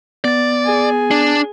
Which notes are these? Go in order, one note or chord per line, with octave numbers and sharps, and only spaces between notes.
B3 D5 A6
G#4 G#5
D4